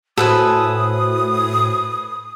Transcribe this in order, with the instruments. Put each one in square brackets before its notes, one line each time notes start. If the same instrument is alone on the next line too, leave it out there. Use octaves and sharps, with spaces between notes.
[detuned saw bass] A2 [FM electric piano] F#4 C5 [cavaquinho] A4 B4 G#5 [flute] D#6